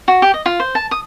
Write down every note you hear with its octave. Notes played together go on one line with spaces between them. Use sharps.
F#4
G4
D#5
F4
C5
A5
D#6